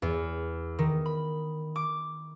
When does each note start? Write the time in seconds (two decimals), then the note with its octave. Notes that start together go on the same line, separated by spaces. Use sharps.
0.02 E2
0.79 D#3
1.06 B5
1.76 D6